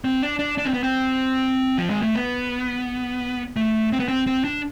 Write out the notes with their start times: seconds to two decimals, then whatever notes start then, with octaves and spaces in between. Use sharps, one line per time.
0.04 C4
0.22 D4
0.39 D4
0.58 D4
0.65 C4
0.73 B3
0.83 C4
1.78 F3
1.90 G#3
2.03 A3
2.15 B3
3.56 A3
3.93 C4
4.00 B3
4.08 C4
4.27 C4
4.44 D4